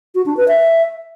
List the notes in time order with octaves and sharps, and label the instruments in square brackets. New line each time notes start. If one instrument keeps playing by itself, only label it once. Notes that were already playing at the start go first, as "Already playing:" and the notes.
[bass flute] F#4
D4
B4
E5